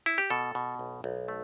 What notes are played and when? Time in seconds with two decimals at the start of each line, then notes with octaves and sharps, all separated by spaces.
0.06 E4
0.18 G4
0.30 B2 A4
0.55 B2
0.79 B1
1.04 B1
1.28 A3